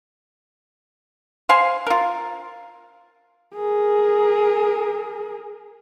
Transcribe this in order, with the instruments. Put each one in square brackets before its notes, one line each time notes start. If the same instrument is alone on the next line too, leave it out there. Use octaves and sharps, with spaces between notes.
[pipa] C5 F5 G#5 C6
F4 A#4
[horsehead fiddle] G#4 A#4